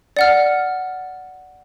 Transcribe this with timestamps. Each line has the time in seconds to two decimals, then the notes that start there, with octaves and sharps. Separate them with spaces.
0.17 D5 F#5 F6